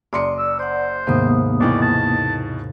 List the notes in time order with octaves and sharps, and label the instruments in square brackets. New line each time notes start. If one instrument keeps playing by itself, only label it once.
[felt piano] F#1 C6 C#7 [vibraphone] D5 [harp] D6 D#6
[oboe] E6
[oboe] C5 [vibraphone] D5 F#5
[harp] D#2 G#2 C3 [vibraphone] A#3 B3 D#6
[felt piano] B2 D#3 E3 [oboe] D5
[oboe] A5